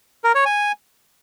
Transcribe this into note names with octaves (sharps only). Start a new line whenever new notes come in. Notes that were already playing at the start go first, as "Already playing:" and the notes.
A#4
C#5
G#5